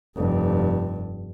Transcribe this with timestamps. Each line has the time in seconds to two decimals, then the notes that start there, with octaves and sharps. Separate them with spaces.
0.17 F1 G2